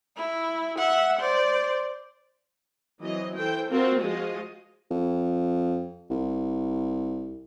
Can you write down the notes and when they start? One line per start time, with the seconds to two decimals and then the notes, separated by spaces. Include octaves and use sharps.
0.16 E4
0.78 E5 F#5
1.19 C5 D5
3.00 E3 F#3 C4 D#5
3.36 E3 A4 C5 G5
3.69 C4 F4 F#4 A#4 C5
4.00 F3 G#3 F4 F#4 D#5
4.91 F2
6.10 C2